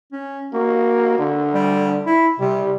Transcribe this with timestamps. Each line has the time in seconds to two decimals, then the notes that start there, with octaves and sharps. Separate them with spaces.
0.12 C#4
0.53 A#3 F#4
1.18 D3
1.54 G3
2.06 E4
2.39 C3 G3